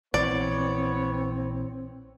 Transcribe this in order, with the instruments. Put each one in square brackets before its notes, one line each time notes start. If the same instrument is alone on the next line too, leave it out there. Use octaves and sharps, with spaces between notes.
[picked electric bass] A#1 E3 [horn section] B3 C#5 [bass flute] C4 [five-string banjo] D5